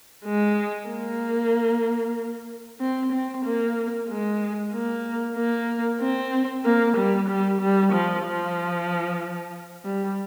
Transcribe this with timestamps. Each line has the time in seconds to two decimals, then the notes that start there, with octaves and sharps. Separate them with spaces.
0.25 G#3
0.88 A#3
2.81 C4
3.12 C4
3.45 A#3
4.08 G#3
4.73 A#3
5.37 A#3
6.01 C4
6.65 A#3
6.97 G3
7.29 G3
7.61 G3
7.93 F3
8.26 F3
9.85 G3